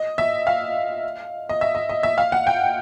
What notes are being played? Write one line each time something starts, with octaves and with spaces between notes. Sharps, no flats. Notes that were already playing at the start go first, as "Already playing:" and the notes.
Already playing: D#5
E5
F5
D#5
E5
D#5
D#5
E5
F5
F#5
G5